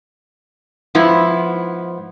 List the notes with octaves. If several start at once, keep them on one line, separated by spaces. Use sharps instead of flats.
G#2 F3 B3 E4